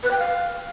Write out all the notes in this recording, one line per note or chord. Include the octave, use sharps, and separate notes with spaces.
B4
G5
F5